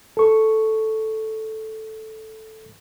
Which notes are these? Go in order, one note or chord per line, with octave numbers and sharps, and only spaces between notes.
A4 C#6